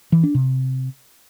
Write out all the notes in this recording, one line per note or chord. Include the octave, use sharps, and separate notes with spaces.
E3
D4
C3